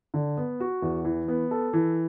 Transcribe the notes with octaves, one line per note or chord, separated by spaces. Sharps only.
D3
B3
F#4
E2
E3
B3
A4
E3